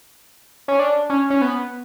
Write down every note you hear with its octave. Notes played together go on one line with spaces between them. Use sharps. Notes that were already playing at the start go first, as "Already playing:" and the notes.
C#4
D4
C#4
C#4
B3